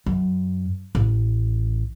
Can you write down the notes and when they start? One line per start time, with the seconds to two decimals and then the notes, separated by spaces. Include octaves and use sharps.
0.06 F#2
0.95 A1